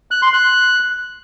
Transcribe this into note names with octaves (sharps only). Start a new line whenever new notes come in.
F#6
C6
F#6